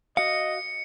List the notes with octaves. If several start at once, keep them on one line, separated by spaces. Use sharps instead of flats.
F#4 D#5 F5 C#7